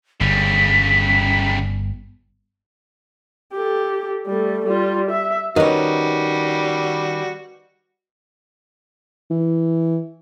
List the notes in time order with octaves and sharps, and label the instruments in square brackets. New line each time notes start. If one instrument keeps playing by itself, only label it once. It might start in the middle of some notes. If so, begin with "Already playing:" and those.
[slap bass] G1 [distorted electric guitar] C#3 G3 [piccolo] B6
[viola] G4 A4
G3 A3
G3 F4
E5
[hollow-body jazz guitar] D#3 C#4 [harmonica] G3 F#4 [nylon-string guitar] B4 D#5
[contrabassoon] E3